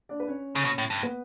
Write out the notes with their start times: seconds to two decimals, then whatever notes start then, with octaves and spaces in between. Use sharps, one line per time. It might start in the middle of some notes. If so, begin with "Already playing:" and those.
0.09 D4 D5
0.20 B4
0.28 C#4 C#5
0.55 C#3
0.65 B2
0.78 A2
0.90 G2
1.02 B3 B4